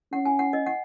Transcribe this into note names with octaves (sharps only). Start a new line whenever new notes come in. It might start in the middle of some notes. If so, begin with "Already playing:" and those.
C#4 F#5
G#5
F#5
D#5
F#5